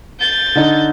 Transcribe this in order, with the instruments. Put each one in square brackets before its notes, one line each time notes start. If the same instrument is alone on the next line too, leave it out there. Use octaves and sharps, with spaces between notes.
[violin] G6 A6
[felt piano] D3 D#4